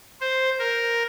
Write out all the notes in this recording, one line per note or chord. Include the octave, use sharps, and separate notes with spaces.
C5
A#4